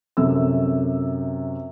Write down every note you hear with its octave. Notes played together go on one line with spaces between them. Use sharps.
F#2 C3 A4 E6